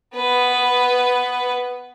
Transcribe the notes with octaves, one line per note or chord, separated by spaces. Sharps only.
B3 B4